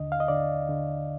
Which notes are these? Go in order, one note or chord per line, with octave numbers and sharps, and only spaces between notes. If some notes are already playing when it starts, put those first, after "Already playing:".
Already playing: D#2 D3 D#5
F5
D#5
D3 D5
D3